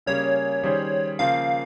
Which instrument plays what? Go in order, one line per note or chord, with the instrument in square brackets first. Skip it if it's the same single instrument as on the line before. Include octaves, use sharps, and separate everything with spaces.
[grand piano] C#3 G3 A#3 C#4 G#4 [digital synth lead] C#5
[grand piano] D#3 G3 C#4 G#4 C5
[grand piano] C#3 F3 A#3 F4 C5 [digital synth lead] F5